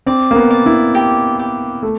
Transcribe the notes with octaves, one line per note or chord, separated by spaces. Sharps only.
C4 D5
A#3
B3
D5
E4
G4
G4
A3